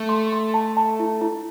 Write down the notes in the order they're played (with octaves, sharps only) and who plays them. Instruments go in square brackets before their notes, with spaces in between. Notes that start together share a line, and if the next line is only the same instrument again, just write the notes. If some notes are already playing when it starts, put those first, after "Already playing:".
Already playing: [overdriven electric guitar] A3
[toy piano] C6
C6
A5
A5
E4
E4